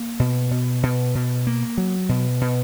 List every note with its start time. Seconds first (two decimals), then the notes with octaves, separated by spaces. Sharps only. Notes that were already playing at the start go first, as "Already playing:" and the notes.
Already playing: A#3
0.20 B2
0.51 B2
0.83 B2
1.15 B2
1.47 A#3
1.78 F#3
2.09 B2
2.41 B2